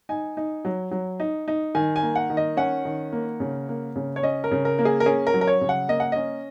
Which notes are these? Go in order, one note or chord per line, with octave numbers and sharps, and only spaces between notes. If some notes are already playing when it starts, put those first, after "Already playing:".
D#4 G#5
D#4
F#3
F#3
D#4
D#4
D#3 G#5
G#5
A#3
F#5
D#3
D#5
C#4 F#5
D#3
A#3
C#3
A#3
C#3
C#5
C#4 D#5
A#4
C#3
A#4
A#3
G#4
A#4
C#4 G#4
A#4
F#3
A#4
C#5
C#3
F#5
A#3 D#5
F#5
C#4 D#5